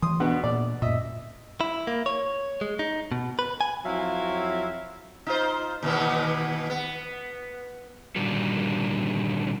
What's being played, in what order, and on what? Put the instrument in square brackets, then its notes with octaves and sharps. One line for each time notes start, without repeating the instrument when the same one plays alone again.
[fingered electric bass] E3 [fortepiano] C6 D#6
[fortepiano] E2 B2 B3 [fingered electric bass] D4
[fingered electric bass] A#2 [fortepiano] D5
[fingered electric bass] F#2 A#2 [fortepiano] D#5 E5
[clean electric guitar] E4
A#3
C#5
G#3
D#4
B2
B4
G#5
[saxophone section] F2 F#3 C4 E4 E5 F5
[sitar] D#4 F4 C5
D#2 B2 E3
B3
[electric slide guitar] A#2 D3 D#3 G3 F#4